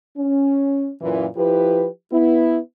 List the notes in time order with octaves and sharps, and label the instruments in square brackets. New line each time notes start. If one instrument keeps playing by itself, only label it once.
[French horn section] C#4
F#2 A#2 E3
F3 E4 G4 B4
B3 E4